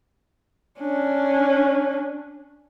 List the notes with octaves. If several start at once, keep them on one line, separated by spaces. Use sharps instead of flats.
C#4 D4